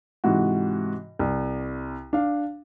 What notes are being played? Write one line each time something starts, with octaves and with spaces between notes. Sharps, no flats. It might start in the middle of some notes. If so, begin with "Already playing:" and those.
G#2 C3 E3 F#4
C2
D4 F5